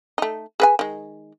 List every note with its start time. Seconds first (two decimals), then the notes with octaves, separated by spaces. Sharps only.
0.18 A3 D#4
0.60 G#4 B4 G#5
0.79 D#3 G#3